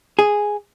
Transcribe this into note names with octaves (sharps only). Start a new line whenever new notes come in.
G#4